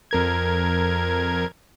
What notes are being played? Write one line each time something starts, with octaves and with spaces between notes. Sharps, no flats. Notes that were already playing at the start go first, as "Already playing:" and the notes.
F2 A#4 G#6